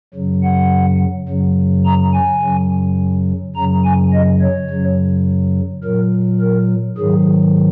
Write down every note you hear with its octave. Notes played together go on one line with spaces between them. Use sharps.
F#2 C#3 F#3
F#5
F#2 C#3 F#3
A#5
G#5
F#2 C#3 F#3
F#2 C#3 F#3 A#5
G#5
D#5
C#5
F#2 C#3 F#3
A#2 F#3 A#4
A#4
G#2 D#3 F#3 G#4